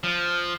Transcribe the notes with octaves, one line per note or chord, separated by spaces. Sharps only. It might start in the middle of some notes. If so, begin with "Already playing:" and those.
F3